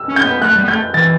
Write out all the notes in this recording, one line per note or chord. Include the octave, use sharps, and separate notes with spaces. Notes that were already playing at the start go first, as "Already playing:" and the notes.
Already playing: E6
C#4
G6
B3
A3 F#6
G3
B3
A3 G6
E3 A6